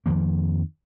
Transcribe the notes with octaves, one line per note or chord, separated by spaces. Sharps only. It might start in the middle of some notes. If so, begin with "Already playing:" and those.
F2 D#3 F3 A#3